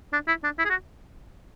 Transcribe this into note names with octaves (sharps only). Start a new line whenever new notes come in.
D4
E4
D4
E4
G#4
F#4